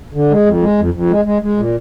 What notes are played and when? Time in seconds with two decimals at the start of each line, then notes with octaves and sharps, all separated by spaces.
0.14 D3
0.31 G#3
0.46 F2
0.62 G#3
0.78 F2
0.94 F2
1.10 G#3
1.25 G#3
1.42 G#3
1.57 A#2